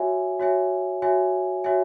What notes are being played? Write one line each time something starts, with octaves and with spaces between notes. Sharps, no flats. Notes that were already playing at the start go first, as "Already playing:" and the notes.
Already playing: F#4 C#5 E5 G#5
F#4 C#5 E5 G#5
F#4 C#5 E5 G#5
F#4 C#5 E5 G#5